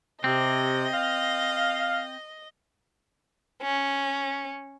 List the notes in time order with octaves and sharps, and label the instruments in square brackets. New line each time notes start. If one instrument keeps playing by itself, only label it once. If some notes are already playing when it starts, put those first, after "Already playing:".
[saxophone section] C3 [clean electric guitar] C4 [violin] D#5
[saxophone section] F5
[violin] C#4